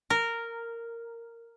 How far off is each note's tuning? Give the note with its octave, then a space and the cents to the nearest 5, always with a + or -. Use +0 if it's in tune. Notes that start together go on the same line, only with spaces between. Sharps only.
A#4 -10